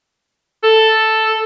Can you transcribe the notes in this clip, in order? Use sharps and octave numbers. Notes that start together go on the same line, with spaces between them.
A4